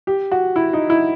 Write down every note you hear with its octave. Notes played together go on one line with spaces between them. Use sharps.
G4
F#4
E4
D#4
E4